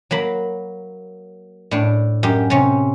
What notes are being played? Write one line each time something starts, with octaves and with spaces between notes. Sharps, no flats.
F#3 A#3 B5
A2 D4
F#2 G4
C3 C#4